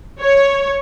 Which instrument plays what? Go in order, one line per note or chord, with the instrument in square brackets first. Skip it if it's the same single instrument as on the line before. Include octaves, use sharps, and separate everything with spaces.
[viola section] C#5